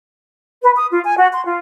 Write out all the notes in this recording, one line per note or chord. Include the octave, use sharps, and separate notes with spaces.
B4
D#6
F4
G#5
F#4
C6
F4